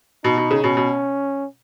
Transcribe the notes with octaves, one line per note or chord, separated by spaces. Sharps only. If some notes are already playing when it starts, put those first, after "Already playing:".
B2 D#4
B2
C#3
B2 C#4
B2